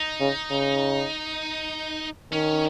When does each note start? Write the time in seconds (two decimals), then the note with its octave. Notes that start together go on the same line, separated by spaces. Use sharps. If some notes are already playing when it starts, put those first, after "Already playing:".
Already playing: D#4
0.20 C#3
0.51 C#3
2.32 D#3 C#4